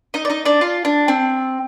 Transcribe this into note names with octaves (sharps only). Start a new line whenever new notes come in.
D#4 D#5
D5
D#4 D#5
D4 D5
F4
D4
C4